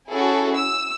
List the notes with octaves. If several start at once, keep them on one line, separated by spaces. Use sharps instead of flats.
C#4 E4 F#4 G#4 A4
E6